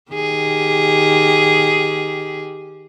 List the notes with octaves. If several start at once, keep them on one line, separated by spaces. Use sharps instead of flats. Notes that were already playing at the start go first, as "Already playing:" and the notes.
D#3 G4 G#4